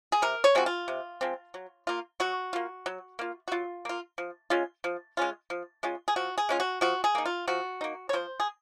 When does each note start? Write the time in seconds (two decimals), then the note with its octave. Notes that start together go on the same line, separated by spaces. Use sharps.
0.12 G#4
0.22 C3 A#4
0.44 C#5
0.55 F3 G#3 C4 F#4
0.66 F4
0.88 C3
1.21 F3 G#3 C4
1.54 F#3
1.87 A#3 F4
2.20 F#3 F#4
2.53 A#3 F4
2.86 F#3
3.19 A#3 F4
3.48 F#4
3.52 F#3 F4
3.85 A#3 F4
4.18 F3
4.50 G#3 C#4 F4
4.84 F3
5.17 G#3 C#4 F4
5.50 F3
5.83 G#3 C#4 F4
6.08 G#4
6.16 F3 F#4
6.38 G#4
6.49 G#3 C#4 F4
6.60 F#4
6.81 F3 F#4
7.04 G#4
7.15 A#3 D#4
7.26 F4
7.47 F3 F#4
7.81 A#3 D#4
8.09 C#5
8.13 F3 C5
8.40 G#4